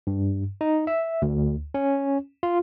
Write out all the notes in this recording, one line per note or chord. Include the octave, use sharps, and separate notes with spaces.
G2
D#4
E5
D2
C#4
F4